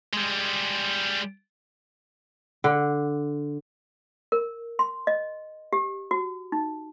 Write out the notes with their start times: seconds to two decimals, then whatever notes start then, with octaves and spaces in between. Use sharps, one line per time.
0.13 G3 G#3
2.64 D3
4.32 A#4
4.79 C6
5.07 D#5
5.73 G4
6.11 F#4
6.52 D#4